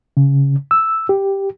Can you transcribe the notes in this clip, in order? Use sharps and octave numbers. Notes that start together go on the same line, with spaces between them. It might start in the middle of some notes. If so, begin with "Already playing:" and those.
C#3
E6
G4